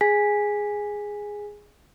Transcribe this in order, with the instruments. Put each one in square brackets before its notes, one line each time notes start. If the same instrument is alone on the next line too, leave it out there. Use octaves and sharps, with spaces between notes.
[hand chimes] G#4 G#5 B6